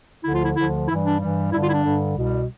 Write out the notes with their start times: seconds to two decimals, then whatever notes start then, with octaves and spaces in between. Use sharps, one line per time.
0.24 D2 D3 F3 E4
0.35 F4
0.45 E4
0.57 D2 D3 F3 E4
0.88 G2 E3 G3 E4
1.04 D4
1.20 G2 E3 G3
1.52 G2 D3 G3 E4
1.63 F4
1.69 E4
1.74 D4
1.84 G2 D3 G3
2.16 C2 B2 G3